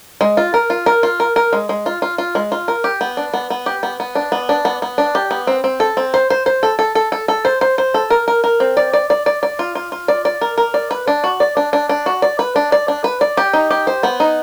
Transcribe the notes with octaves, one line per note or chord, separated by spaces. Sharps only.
G#3
F4
A#4
F4
A#4
F4
A#4
A#4
G#3
G#3
F4
F4
F4
G#3
F4
A#4
G4
B3
D4
B3
B3
G4
B3
B3
D4
B3
D4
B3
B3
D4
G4
B3
C4
C4
A4
C4
C5
C5
C5
A4
A4
A4
A4
A4
C5
C5
C5
A4
A#4
A#4
A#4
C4
D5
D5
D5
D5
D5
F4
F4
F4
D5
D5
A#4
A#4
D5
B4
D4
F#4
D5
D4
D4
D4
F#4
D5
B4
D4
D5
D4
B4
D5
G4
D#4
G4
C5
B3
D#4